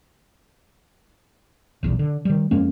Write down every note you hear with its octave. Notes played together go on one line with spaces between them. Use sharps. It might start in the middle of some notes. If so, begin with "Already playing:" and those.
D#1 B1 E2
D3
D#3 G3
F2 G#3 A#3 C#4